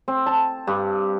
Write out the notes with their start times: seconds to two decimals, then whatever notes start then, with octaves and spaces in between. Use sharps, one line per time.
0.08 C4
0.26 A5
0.67 G2